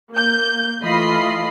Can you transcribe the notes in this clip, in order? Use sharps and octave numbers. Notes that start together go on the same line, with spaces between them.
A#3 G6
E3 A3 F4 D#5 B5 C7